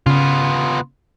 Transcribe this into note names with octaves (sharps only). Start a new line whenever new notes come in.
C#3 B3 F4